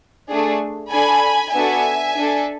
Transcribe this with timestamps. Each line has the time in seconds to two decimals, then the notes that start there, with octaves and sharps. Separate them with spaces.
0.30 A3 D4 G#4
0.91 D4 A4 G#5 B5
1.54 B3 D4 F#4 A4 E5 G#5
2.16 D4 A4